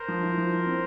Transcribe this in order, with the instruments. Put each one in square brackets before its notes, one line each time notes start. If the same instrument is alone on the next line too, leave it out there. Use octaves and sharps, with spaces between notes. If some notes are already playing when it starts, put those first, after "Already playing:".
Already playing: [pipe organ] A#4 C5
[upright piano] F3
E4
F3
E4
C4